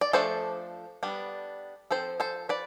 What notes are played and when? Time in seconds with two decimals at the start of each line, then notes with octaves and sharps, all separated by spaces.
0.01 D5
0.13 F3 A3 D4 A4 C5
1.03 G3 B3 D4
1.91 F3 C4 A4 C5
2.20 A4 C5
2.49 B4 D5